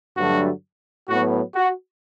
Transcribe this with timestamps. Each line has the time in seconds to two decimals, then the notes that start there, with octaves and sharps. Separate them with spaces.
0.17 G2 D3 F#3 A3 F#4
1.09 A2 F#3 B3 F#4
1.55 F#4